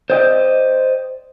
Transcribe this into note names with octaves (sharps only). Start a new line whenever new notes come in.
C5 D5 D#5 G5